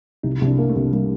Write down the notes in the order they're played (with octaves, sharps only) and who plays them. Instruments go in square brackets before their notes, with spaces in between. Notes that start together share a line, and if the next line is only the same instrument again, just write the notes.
[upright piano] C2 [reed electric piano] D#4
[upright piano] C2 [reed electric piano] D4
[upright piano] A#3
[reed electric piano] A3
[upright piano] C2
[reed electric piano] G3 [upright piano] A#3